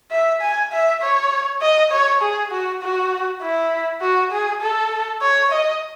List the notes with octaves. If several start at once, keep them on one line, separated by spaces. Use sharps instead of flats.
E5
G#5
E5
C#5
D#5
C#5
G#4
F#4
F#4
E4
F#4
G#4
A4
C#5
D#5